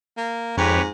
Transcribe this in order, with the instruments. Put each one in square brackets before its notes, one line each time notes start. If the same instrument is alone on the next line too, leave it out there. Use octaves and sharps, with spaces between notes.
[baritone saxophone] A#3
[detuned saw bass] F2 [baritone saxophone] G#2 [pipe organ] G4 B4 C#5